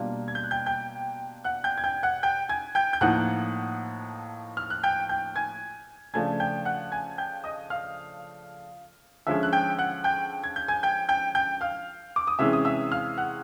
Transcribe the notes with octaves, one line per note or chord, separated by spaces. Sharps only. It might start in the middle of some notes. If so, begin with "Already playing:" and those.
Already playing: B2 G3 A#3 D4 F4
G#6
G6
F#6
G5 G6
G5 G6
F#5 F#6
G5 G6
G#6
G5 G6
F#5 F#6
G5 G6
G#5 G#6
G5 G6
G6
A2 F3 A#3 D#4 F#5 F#6
F6
F#6
G5 G6
G5 G6
G#5 G#6
C#3 F3 A3 D4 G#5 G#6
G5 G6
F#5 F#6
G#5 G#6
G5 G6
D#5 D#6
F5 F6
D3 F3 G#3 C#4 E5 E6
F#6
G5 G6
F#5 F#6
G5 G6
G#6
G6
G#5 G#6
G5 G6
G5 G6
G5 G6
F5 F6
D6
D#6
C3 E3 G#3 C#4 E5 E6
D#6
E5 E6
F5 F6
F#5 F#6